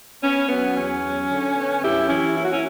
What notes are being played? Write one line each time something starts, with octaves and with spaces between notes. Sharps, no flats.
B3 C#4
F#3 B3
E2 C#4
F#3
D3
B3
F#2 E4 G4
E3 C#4 E4
A#3 E4
F#4
C#4 E4